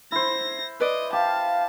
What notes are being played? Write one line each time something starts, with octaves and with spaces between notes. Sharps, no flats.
E4 C5 A#6
B4 D5 D#5
G4 F5 A5